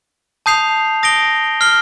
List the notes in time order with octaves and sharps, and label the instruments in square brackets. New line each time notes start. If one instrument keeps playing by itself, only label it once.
[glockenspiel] A5 D#6 G6 C7 F7
D#6 A#6 D7 G7
F6 C7 G7